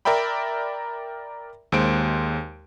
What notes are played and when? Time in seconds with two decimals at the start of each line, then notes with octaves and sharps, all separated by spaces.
0.05 A#4 D5 E5 G5 B5
1.72 D#2 G#3 C5 D7